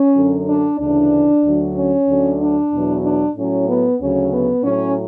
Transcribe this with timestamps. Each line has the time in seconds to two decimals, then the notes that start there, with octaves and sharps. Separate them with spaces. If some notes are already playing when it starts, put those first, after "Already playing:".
Already playing: C#4
0.15 F#2 D3 F#3
0.48 D4
0.79 D2 C#3 E3 D4
1.43 D2 D3 F#3
1.75 C#4
2.07 D2 D3 F#3
2.40 D4
2.72 E2 B2 F#3
3.03 D4
3.36 A2 F#3 C#4
3.67 B3
3.99 D2 C#3 F#3 C#4
4.31 B3
4.63 A2 F#3 C#4